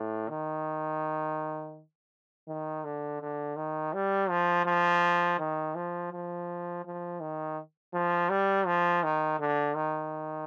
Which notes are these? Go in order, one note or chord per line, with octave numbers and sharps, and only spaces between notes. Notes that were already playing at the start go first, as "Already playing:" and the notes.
Already playing: A2
D#3
D#3
D3
D3
D#3
G3
F3
F3
D#3
F3
F3
F3
D#3
F3
G3
F3
D#3
D3
D#3